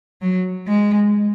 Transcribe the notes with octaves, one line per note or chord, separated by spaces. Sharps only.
F#3
G#3